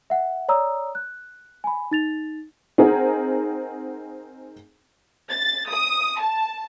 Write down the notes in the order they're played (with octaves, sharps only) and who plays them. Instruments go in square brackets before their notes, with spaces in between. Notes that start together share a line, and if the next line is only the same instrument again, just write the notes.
[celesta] E5 F#5
C#5 D5 A#5 D#6 E6
F#6
G#5 B5
D#4 A6 F7
[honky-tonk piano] C4 D#4 G#4 A#4 F#5
[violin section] A6
D#6
A5